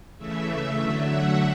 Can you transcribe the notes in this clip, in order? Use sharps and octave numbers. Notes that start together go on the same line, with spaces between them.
C#3 E3 A3 E5
E5
D3 F#3 A3
F#5